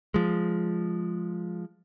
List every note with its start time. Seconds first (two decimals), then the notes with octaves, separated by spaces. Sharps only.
0.14 F3 G#3